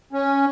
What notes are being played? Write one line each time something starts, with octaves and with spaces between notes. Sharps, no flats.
C#4